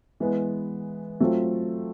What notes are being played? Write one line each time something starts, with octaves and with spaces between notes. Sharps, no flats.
E3 G#3 B3
F#3 A3 C4 F4